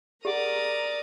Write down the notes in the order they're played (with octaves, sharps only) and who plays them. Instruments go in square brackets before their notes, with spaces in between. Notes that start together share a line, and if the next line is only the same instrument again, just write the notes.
[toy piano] G4 G#4 F#5 [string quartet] A#4 A#5 D#6 [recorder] D5